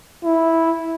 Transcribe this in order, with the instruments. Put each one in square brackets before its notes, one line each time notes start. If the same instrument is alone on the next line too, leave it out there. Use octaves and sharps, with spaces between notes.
[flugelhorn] E4